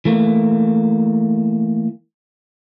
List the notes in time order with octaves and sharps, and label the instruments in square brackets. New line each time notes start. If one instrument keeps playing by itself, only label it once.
[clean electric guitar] E3 A3 A#3